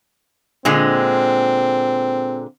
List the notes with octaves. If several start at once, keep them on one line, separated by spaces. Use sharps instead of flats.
A#2 D3 G#3 C4